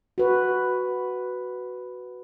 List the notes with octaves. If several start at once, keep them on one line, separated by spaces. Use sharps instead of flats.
F#4 B4